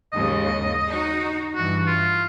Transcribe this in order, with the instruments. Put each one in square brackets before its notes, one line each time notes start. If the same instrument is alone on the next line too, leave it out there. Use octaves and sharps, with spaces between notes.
[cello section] D#2 G#2 C#3 [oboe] D#5
[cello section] D#4 F#4
[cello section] G2 E3 [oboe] F#4
[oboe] F4